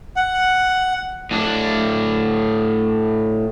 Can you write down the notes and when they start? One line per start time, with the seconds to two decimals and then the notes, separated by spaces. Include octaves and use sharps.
0.16 F#5
1.31 A2 D4